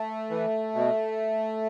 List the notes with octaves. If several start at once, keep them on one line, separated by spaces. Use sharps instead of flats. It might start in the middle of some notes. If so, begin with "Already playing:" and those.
Already playing: A3
E3
B2